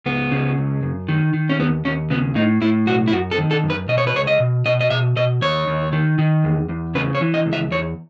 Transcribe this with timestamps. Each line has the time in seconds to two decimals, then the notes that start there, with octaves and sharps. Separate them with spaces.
0.06 C#2 B3
0.32 C#3
0.58 C#2
0.83 F#2
1.09 D#3
1.34 D#3
1.50 C#4
1.59 D#2 B3
1.85 D#2 C#4
2.10 C#3 B3
2.35 A2 D#4
2.61 A2 E4
2.86 B1 F#4
3.08 E4
3.12 F#2 F#4
3.31 A4
3.38 D#3
3.51 A4
3.64 F#2
3.70 B4
3.88 B2 D#5
3.98 C#5
4.07 B4
4.15 C#2 C#5
4.27 D#5
4.40 B2
4.66 B2 D#5
4.81 D#5
4.90 B2 E5
5.16 B2 D#5
5.42 D#2 C#5
5.67 D#2
5.93 D#3
6.19 D#3
6.44 E2
6.69 E2
6.95 C#3 B4
7.15 C#5
7.21 E3
7.34 D#5
7.46 C#2
7.53 E5
7.71 E2 C#5